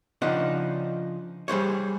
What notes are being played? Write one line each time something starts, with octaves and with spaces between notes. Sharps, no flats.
C#3 F3 D4 D#4 F#5
G3 G#4 C5 C#5